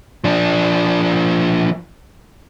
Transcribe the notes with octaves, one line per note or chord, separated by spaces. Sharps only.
F3 D4